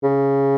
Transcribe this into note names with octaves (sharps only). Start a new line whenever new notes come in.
C#3